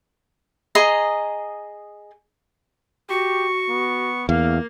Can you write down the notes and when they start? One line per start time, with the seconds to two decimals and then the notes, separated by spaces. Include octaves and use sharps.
0.75 G#4 D#5 A#5 C6
3.10 F#4 G4 C#6
3.69 B3
4.29 E2 A#3 F5